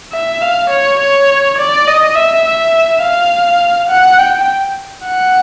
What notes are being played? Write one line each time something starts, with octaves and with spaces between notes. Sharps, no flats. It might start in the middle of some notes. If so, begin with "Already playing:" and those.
E5
F5
C#5
C#5
D5
D#5
E5
E5
F5
F#5
G5
F#5